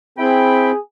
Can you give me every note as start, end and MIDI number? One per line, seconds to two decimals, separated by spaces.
0.18 0.72 60
0.18 0.70 64
0.18 0.78 68
0.18 0.70 79
0.18 0.70 83